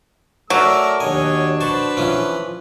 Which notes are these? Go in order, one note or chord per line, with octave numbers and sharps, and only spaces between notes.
F#3 A3 A4 A#4 D5 D6 E6
D#2 D4 F#4 C#5 D#5 G#5
B4 C5 A5 C#6
E3 F3 C#4